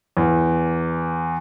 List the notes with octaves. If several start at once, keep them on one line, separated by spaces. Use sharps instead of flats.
E2